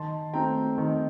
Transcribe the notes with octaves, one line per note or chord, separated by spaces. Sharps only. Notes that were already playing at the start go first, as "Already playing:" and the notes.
Already playing: D#3 A5 C6
A3 C4 G5 A#5
D#3